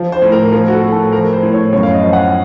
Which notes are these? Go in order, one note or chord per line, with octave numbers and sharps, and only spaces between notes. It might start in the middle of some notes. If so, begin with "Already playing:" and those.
Already playing: F3
C5
A2
A#4
F3 A#4
F#4
A4
A2
A4
F3 A#4
C5
A2
C#5
F#2 C#5
F5
D#5
F3
F#5